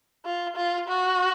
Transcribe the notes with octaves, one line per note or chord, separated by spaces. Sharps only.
F4
F4
F#4